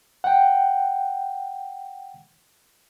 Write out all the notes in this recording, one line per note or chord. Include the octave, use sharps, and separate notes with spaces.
F#5 G5